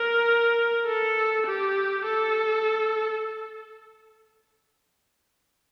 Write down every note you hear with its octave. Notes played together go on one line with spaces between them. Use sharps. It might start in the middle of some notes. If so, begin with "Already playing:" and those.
Already playing: A#4
A4
G4
A4